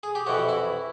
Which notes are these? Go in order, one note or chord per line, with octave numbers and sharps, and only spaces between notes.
G#4
G4
F2 C3 E3 F#4
E4